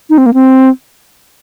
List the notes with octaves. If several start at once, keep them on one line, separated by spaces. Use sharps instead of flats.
D#4
C4
A#3
C4